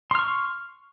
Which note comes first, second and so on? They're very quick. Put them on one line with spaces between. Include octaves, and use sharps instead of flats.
C6 F6 C#6